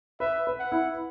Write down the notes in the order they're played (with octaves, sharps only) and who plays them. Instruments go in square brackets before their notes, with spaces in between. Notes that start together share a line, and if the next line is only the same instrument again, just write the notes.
[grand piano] B4 [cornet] E5
[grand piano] B4
[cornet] F#5
[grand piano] E4